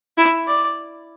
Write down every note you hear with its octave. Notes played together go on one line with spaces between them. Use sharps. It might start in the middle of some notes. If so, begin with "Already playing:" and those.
E4
D5